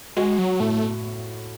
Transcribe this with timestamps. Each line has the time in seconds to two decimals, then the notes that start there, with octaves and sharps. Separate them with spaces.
0.17 G#3 F#4
0.38 F#3
0.60 A2 A3